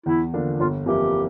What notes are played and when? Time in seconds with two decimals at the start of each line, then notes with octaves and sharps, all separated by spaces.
0.06 E2 E4
0.33 D3 F3 A#3 D4
0.60 G1 F4
0.86 F2 E3 A#3 E4 G4